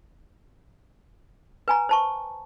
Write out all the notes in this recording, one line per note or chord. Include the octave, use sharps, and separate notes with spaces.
B4 G#5 A#5
C5 A5 C#6